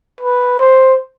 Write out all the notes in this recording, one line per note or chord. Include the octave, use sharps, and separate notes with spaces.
B4
C5